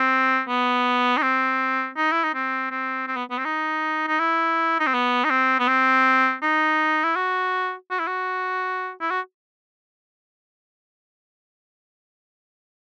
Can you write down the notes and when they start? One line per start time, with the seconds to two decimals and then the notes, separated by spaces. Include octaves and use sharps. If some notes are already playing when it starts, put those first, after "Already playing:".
Already playing: C4
0.49 B3
1.17 D#4
1.22 C4
1.97 D#4
2.12 E4
2.24 D#4
2.34 C4
2.71 C4
3.07 C4
3.16 B3
3.31 B3
3.38 C4
3.45 D#4
4.07 D#4
4.19 E4
4.80 D#4
4.87 C4
4.94 B3
5.24 D#4
5.30 C4
5.59 B3
5.68 C4
6.42 D#4
7.04 E4
7.16 F#4
7.90 F#4
7.99 E4
8.07 F#4
9.01 E4
9.10 F#4